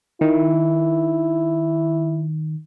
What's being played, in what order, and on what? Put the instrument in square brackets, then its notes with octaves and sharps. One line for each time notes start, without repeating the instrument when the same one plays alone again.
[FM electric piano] D#3 [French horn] E4